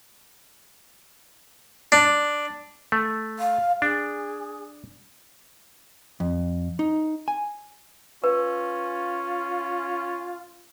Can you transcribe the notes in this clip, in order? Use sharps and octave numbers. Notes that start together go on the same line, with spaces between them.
D4
A3
F5
D4 G#4
F2
D#4
G#5
C#4 F4 B4